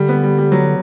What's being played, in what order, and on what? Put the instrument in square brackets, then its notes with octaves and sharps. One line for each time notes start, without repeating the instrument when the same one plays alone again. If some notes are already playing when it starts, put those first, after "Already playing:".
Already playing: [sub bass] D3 [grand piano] G3
[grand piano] B3
G3
G3
F#3